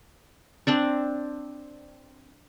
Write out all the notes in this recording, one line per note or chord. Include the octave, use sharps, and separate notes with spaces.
C4 D4 D5